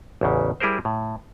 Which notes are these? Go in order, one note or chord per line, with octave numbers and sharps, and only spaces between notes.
A1 E2 C#3
G3 E4 G#4 A#4 C5
A2